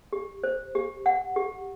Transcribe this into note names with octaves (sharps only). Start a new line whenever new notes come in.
G4
C5
G4
F#5
G4